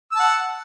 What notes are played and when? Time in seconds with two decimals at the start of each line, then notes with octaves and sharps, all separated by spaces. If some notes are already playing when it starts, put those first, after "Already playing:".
0.12 E6
0.16 A5
0.19 F#5